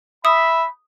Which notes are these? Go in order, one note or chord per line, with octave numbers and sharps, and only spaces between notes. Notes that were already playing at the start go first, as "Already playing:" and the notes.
E5 B5 D#6